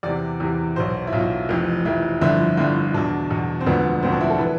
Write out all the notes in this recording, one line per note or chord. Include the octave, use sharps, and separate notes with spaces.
E2 C3 E3 D5
E2 C3 E3
B1 B2 C5
E4
B1 B2 F4
F1 F2 E3
F1 F2 E3 E4
G1 F2 D3 F3 E4
G1 F2 D3 F3 E4
E2 B2 D4
E2 B2
C4
E1 D2 D3 F3 B3
E1 D2 D3 F3 C4
D4
E4
A4
E3 B4